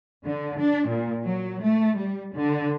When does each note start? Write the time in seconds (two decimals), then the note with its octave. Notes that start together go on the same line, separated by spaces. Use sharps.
0.24 D3
0.61 D4
0.89 A#2
1.23 F#3
1.61 A3
1.97 G3
2.34 D3